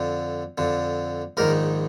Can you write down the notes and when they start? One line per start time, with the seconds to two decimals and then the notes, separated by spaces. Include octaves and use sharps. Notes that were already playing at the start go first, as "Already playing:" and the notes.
Already playing: F2 D3
0.58 F2 D3
1.37 A#1 G#2 D#3 A#4